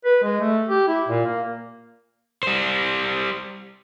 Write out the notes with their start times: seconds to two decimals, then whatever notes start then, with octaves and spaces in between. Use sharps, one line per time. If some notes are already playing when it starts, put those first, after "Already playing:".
0.04 B4
0.23 G#3
0.40 A3
0.69 G4
0.88 E4
1.08 A#2
1.26 A#3
2.43 G3 C5